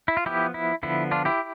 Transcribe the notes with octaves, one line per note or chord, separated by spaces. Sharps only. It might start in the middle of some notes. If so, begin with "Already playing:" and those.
E4
F4
F3 B3 E4 G4
E4
D3 F3 B3 E4
D4 F4
E4 G4